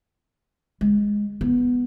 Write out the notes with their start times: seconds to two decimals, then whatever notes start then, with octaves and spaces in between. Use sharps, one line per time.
0.81 G#3
1.41 B3